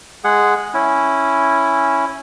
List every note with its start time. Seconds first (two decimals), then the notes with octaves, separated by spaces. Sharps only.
0.24 G#3 G#4 F#5
0.74 C#4 E4